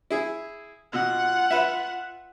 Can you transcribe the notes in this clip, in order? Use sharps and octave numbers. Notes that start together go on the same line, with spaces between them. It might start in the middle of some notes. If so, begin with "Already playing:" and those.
E4 G#4
B2 F4 F#5
B4 E5